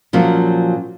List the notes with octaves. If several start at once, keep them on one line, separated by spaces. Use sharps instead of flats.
A#2 F3 F#3 C#4